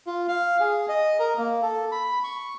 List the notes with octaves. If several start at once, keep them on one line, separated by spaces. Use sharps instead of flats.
F4
F5
G#4
D#5
A#4
A#3
A4
B5
C#6